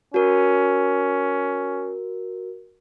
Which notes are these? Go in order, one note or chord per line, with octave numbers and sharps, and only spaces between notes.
C#4 F#4 A#4